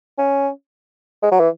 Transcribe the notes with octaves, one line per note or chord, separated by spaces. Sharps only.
C#4
G#3
F#3
E3